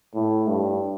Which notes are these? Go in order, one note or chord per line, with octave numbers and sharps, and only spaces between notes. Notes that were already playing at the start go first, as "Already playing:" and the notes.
A2
G2